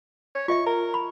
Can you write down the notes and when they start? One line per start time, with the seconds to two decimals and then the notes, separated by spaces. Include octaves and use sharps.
0.35 C#5
0.48 F4 D#5 E5 C#6
0.66 A#4
0.94 B5